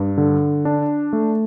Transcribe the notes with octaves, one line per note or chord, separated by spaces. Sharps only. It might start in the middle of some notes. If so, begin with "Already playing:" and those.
Already playing: G2
D3
D4
A3